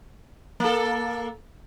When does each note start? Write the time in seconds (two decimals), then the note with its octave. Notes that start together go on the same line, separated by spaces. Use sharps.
0.60 A#3 A4